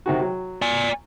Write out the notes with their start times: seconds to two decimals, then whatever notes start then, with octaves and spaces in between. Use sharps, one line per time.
0.06 C3 D#3 F#4
0.21 F#3
0.62 D5 G#5